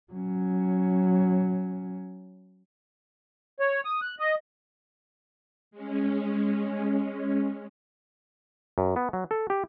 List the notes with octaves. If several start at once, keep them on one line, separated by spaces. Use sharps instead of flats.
F#3 C#4
C#5
D#6
F#6
D#5
G#3 C#4
F#2
B3
F#3
A4
G4